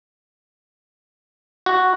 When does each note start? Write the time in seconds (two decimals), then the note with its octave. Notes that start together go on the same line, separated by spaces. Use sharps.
1.66 F#4